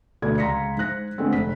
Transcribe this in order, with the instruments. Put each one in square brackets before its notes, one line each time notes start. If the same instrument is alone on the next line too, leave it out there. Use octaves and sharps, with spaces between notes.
[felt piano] D2 B2 A4 D5 G#6
C#2 A#5 C6 A#6 B6 C#7
G#2 C5 F#6 A#6
D3 G#3 A3 B3 C4
F1 B6